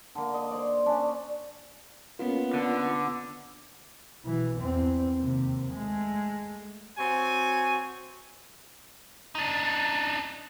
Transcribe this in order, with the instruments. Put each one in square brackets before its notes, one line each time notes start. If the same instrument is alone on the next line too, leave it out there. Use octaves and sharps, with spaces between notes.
[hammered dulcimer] D3 A#3
D#5
C5 D5
C#4 D4
[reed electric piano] A#3 C#4 F4 [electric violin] B3
[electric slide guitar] D3
[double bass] B2 E3
E2 C4
D#2 C3
G#3 A3
[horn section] C4 F#4 C#5 G#5
[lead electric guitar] D4 D#4